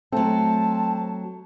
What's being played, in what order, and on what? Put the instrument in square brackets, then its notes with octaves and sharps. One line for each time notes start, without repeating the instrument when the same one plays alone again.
[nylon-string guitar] F#3 A3 [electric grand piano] C4 [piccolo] A5